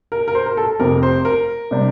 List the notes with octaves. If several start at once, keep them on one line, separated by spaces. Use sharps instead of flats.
A#4
A#4
C5
A#4
A4
F1 F2 C3 A#4
C5
A#4
C3 G3 D4